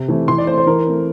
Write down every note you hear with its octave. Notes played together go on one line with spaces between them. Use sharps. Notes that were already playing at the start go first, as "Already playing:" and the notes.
Already playing: C3
E3 A3 C4
E3 C6
D5
A3 C4 C5
C5
E3 A#4
A3 C4